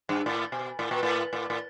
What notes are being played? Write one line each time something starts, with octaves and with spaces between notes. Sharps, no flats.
G2
A2
B2
A2
A#2
A2
A2
A2